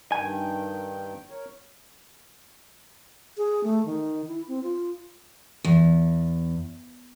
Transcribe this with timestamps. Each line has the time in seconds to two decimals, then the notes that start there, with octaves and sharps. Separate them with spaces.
0.12 G2 D#3 G5 G#5
1.30 A#4 C#5
3.37 G#4
3.64 A3
3.86 D#3
4.28 E4
4.48 C4
4.63 F4
5.64 E2